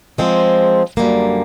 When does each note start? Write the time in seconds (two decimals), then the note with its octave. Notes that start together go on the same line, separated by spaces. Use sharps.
0.18 F3 G#3 C4
0.97 F#2 D3 G3 A#3